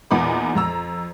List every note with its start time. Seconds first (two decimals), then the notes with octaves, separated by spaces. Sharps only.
0.11 E2 A#2 B3 D#4 B5 D6
0.55 F2 A#5 E6